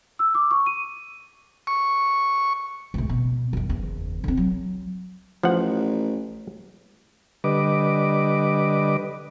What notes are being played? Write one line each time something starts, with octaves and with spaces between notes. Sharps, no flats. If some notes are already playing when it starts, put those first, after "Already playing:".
E6
D6
C#6
D#7
C#6
C#2 A2
B2
F#2 D#3
F#1 E2
D3 C4
F#3
A1 F3 F#5
D3 G3 B4 D#5 D6